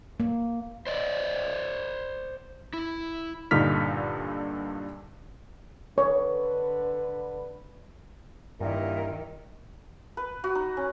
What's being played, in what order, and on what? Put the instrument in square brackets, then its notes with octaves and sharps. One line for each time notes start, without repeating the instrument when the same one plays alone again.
[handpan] A#3
[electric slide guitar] C5 D5 D#5
E4
[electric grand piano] G2 A#2 D3 D#4 F6 B6
[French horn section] D3 B4 [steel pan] C#5
[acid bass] G2 [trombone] A#2 [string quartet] D#3 [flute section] E4 A#4 E5
[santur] B4
F#4
D#4
C#4